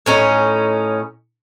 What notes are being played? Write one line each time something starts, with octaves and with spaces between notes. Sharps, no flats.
A2 C#4 D#4